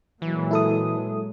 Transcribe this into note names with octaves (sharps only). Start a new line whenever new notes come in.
A#2 E3 F#3 G#3
E4 A4 D#6